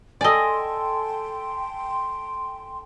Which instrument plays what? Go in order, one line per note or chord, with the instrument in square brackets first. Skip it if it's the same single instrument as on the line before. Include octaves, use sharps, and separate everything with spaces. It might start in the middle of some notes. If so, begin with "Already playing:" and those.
[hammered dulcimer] A4 G#5 [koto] D5 D#5 [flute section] G5 C6